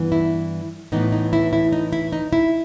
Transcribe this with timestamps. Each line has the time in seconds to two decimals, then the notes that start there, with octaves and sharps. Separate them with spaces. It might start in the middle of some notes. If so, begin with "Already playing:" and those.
Already playing: G2 E3 B3
0.12 E4
0.92 A2 E3 B3 D#4
1.12 D#4
1.33 E4
1.53 E4
1.73 D#4
1.93 E4
2.13 D#4
2.33 E4